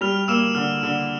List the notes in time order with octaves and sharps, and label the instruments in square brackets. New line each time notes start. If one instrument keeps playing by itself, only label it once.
[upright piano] G3 [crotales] F6 F7
[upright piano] A#3 [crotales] E6 E7
[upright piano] D3 [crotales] F6
[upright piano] D3